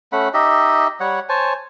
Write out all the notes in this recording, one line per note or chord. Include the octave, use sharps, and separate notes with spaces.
A3 C#4 F#5 B5
D#4 G4 D#5 E5
G3 C#5 F#5
C5 C#5 G#5 A5